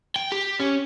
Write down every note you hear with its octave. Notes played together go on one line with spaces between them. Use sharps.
G5
G4
C#4